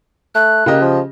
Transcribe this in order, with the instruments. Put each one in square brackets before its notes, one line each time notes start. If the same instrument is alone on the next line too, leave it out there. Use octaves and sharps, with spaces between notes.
[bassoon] A3 [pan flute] F#6
[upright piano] C#3 G4 D#5 [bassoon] A#3
[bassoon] F3